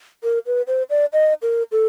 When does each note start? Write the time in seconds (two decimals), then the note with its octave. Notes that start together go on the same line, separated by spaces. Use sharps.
0.23 A#4
0.46 B4
0.67 C5
0.90 D5
1.13 D#5
1.42 A#4
1.72 A4